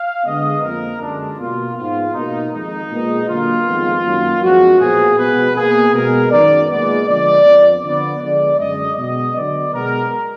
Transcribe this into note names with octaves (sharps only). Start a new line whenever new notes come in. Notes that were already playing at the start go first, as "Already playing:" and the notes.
Already playing: F5
D3 G#3 B3 D#5
F2 F3 A#3 A#4
F#2 D3 G#3 D4
B2 A#3 F4
G#2 F3 B3 F4
B2 A#3 D#4
F2 D#3 G#3 D#4
A#2 G#3 B3
D3 F#3 A#3 F4
F2 D#3 G#3 B3
F#2 D#3 F#3 A#3
F#2 F3 G#3 B3 F#4
A#2 F3 B3 G#4
B2 G#3 B3 B4
B2 A#3 G#4
B2 G#3 B3 A#4
F#2 D#3 G#3 B3 D5
A#2 G#3 B3 D5
D3 F3 G#3 B3 D5
F2 F3 B3
D3 F3 B3 D5
D3 F3 G#3 B3 D5
F#2 D3 G#3 D#5
B2 G#3 B3 D#5
D3 F#3 B3 D5
B2 G#3 B3 A#4